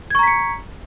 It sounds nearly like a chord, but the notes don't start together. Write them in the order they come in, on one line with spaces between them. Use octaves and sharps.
G#6 C#6 A#5 B6 C#7